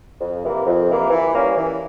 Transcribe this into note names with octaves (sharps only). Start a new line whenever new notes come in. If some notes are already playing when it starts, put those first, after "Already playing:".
F2
C3 E3 A#3
F2
C3 E3 A#3
E3
G3 A#3 C#4
E3